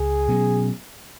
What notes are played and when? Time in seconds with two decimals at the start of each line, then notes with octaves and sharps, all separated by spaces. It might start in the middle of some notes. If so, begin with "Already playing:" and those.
Already playing: C#2 G#4
0.28 B2 F#3 C#4